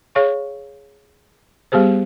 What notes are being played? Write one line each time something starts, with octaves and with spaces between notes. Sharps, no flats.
G#4 C#5 F5 C#6
G3 B3 G4 G#4 C5